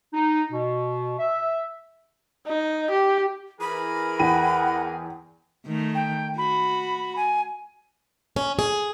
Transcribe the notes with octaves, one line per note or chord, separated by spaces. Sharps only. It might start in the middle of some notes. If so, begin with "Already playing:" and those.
D#4
B2
E5
D#4
G4
E3 G#4 A#4 B5
E2 F#5 G5 D#7
D#3 A3
G5
F#4 B5
G#5
C#4
G#4